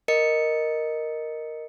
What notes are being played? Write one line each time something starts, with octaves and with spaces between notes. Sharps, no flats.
A#4 D#5 C#7